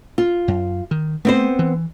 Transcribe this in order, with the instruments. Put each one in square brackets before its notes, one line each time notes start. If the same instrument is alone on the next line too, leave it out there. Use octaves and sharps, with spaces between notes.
[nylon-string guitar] F4
[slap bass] F#2
D#3
[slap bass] A3 [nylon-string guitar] B3 C4 C5
[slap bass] E3